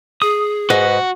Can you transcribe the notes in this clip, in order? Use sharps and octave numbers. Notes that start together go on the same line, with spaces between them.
G#4 D#6
G#2 F#4 B4 D#5